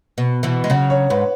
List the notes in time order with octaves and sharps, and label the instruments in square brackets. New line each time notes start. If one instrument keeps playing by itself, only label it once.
[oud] B2
B2 E3
G#3
[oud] C#3 F#3 [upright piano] F#5
[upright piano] C#5
[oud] G#2 [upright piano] B4